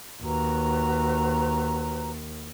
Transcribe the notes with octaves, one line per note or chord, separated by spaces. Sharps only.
D#2 F#4 B4 A#5